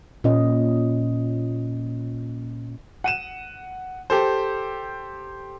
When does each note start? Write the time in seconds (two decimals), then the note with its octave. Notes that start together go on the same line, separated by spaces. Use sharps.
0.24 A#2 C#4 D#5
3.04 F#5 D#7 E7
4.10 G4 A4 C5